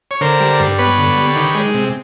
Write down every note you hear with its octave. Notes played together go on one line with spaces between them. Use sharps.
C#5
D3 A#4 C5
G3
G2
B3 B4 C#5
D3
G3
D#3
G#3
C3